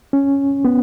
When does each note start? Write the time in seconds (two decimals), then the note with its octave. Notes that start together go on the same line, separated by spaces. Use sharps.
0.13 C#4
0.65 B3